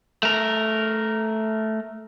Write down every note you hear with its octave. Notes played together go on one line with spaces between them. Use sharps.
A3 A#4